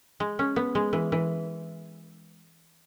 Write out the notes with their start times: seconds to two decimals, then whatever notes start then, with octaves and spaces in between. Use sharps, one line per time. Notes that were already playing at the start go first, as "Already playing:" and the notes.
0.20 G#3
0.39 C#4
0.56 B3
0.75 G#3
0.93 E3
1.12 E3